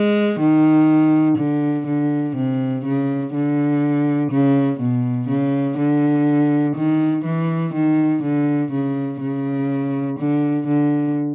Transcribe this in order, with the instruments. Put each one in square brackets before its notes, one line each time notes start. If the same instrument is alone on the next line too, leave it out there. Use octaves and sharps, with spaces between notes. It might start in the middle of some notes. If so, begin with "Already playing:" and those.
Already playing: [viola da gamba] G#3
D#3
D3
D3
C3
C#3
D3
C#3
B2
C#3
D3
D#3
E3
D#3
D3
C#3
C#3
D3
D3